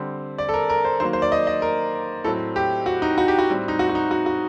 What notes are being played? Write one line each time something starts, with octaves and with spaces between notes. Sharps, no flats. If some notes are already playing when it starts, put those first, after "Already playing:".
Already playing: D3 G3 C4
D5
A4
A#4
A#4
C5
D#3 F#3 A#3 C5
C5
D5
D#5
D#5
A#4
A2 F#3 C4 A4
G4
F#4
D#4
F#4
G4
F#4
A2 G3 C4
D#4
F#4
F#4
D#4
F#4
F#4